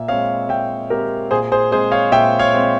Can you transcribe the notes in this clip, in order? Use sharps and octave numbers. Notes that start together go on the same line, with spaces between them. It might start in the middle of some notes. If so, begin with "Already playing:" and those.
Already playing: A#2 E5
G#3 C4 C#5 F5
A#2 E5 G5
G#3 C4 G4 A#4
A#2 G#4 C5
G#4 C5
G#3 C4 G#4 C5
C#5 F5
A#2 E5 G5
C#5 F5
G#3 C4